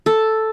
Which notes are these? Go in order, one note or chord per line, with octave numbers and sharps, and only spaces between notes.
A4